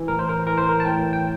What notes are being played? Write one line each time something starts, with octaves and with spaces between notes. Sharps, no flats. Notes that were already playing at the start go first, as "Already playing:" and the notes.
Already playing: E3
A2 A#4
C5
A#4
E3 A#4
C5
A#4
A5
A2 G5
G5